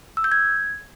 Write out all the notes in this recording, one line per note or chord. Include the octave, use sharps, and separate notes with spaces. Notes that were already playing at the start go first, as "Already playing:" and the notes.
E6
G6
G#6